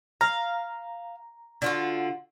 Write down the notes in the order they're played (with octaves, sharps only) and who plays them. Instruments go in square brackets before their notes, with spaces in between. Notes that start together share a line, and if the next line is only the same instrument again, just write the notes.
[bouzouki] F5 [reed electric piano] A#5
[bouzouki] D3 F4 F#4